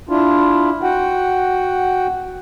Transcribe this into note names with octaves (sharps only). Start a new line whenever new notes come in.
D4 E4 F4
F#4 F#5 G5